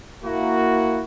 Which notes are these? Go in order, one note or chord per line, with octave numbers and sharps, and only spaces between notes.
A#3 E4 F#4